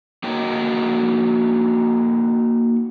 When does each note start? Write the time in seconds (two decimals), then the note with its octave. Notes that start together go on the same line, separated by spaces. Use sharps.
0.23 A#3 D#4 F#4 A#4 C#5 G5